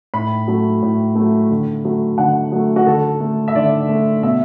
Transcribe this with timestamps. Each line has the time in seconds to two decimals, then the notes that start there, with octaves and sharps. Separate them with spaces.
0.14 A2 B5
0.48 F#3 A3
0.82 A2
1.15 F#3 A3
1.51 D3
1.85 F#3 A3
2.18 D3 F#5
2.52 F#3 A3
2.76 F#4
2.87 D3 A4
3.20 A3
3.48 E5
3.55 D3 D5
3.89 A3
4.23 B2 E5